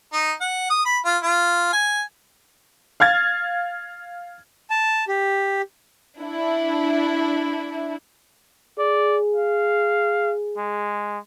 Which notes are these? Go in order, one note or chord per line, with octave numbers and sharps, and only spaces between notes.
D#4
F#5
D#6
B5
F4
F4
G#5
F5 F6 G#6 A6
A5
G4
D4 E4
G#4 D5
F5
G#3